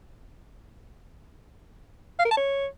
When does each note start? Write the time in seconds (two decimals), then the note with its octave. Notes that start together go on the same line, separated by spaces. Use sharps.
2.19 F5
2.25 A#4
2.31 A5
2.37 C#5